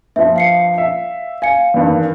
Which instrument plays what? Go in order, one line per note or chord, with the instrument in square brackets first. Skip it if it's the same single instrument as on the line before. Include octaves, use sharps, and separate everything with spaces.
[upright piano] G2 F3 [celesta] E5
[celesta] F5 C7 C#7
[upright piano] E5
[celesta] F5 C#7 [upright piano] G#5
[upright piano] E2 G2 D#3